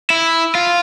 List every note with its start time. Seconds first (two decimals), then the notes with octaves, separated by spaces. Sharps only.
0.10 E4
0.55 F4